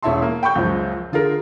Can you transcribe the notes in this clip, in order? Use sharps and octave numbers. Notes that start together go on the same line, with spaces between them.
E1 C#4 E4 E5 A5 C6
A#3
G5 B5 C#6 G6
C#2 F#2 F3
D3 F4 G#4 A#4